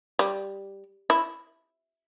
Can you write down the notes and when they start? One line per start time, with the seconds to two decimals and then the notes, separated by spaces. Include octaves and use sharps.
0.19 G3
1.10 E4